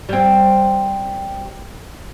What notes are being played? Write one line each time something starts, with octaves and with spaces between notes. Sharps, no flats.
G3 C4